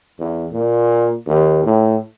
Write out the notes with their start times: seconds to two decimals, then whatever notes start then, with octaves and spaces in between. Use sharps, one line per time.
0.19 E2
0.52 A#2
1.26 D#2
1.64 A2